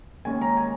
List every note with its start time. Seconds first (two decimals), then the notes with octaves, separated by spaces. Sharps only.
0.25 D#2 D#3 G#3 C#4 G#5
0.41 A#5
0.57 G#5